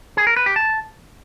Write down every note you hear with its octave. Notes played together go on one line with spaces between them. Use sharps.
G#4
A#4
B4
G4
A5